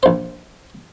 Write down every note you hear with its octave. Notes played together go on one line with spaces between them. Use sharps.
A#1 C5